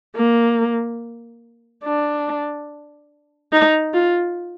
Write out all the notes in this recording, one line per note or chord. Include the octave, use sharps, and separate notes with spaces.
A#3
D4
D#4
F4